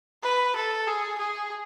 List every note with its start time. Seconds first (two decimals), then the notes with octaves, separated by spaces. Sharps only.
0.23 B4
0.56 A4
0.87 G#4
1.19 G#4